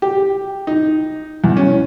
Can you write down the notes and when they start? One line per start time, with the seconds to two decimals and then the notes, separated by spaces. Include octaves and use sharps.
0.02 G4
0.67 D#4
1.44 E2
1.57 C#4